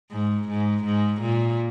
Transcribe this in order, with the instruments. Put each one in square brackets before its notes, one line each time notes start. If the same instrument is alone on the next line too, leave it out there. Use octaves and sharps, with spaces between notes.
[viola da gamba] G#2
G#2
G#2
A#2